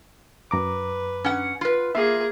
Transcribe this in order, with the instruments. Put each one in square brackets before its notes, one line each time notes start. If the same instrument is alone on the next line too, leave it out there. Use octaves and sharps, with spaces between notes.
[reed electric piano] F#2 A#5 D6 [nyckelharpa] B4
[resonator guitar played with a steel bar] C#4 F#5
F4 B4
[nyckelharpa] A#3 G#4 [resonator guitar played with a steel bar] F4 [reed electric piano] E5